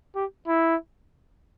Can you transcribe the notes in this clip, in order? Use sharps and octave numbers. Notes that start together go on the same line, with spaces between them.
G4
E4